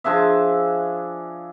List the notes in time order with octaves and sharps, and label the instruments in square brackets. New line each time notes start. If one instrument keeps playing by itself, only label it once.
[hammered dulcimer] F3 D4 G#4 E5